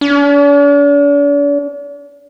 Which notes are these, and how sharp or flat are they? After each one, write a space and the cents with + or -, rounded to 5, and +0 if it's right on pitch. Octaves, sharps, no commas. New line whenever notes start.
D4 -45